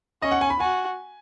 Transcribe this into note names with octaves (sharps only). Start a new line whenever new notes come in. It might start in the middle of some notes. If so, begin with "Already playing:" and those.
C#4 D#5
F#5
G#5
B5
F#4 G#5